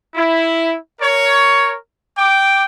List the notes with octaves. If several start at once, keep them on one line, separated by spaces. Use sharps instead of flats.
E4
A#4 C#5
G5 D6